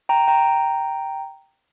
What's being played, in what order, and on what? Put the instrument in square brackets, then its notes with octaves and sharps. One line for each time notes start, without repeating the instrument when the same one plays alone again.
[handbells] G5 A#5
G5 A#5